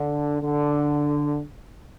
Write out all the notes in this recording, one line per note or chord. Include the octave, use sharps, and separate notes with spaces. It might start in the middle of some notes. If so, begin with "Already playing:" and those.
Already playing: D3
D3